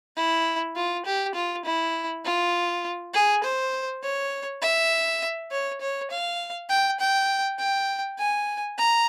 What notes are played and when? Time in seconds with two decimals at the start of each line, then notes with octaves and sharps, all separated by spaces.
0.16 E4
0.76 F4
1.06 G4
1.35 F4
1.65 E4
2.25 F4
3.14 G#4
3.44 C5
4.03 C#5
4.62 E5
5.51 C#5
5.81 C#5
6.11 F5
6.69 G5
7.00 G5
7.59 G5
8.18 G#5
8.78 A#5